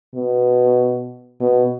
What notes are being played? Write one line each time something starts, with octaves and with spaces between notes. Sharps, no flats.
B2
B2